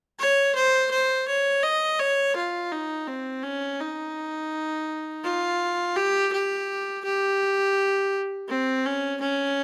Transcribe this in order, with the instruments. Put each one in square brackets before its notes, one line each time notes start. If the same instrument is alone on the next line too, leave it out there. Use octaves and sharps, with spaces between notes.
[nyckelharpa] C#5
C5
C5
C#5
D#5
C#5
F4
D#4
C4
C#4
D#4
F4
G4
G4
G4
C4
C#4
C#4